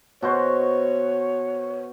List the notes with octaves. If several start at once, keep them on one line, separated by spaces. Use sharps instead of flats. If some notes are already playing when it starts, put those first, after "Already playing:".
B2 F#4 C5 C#5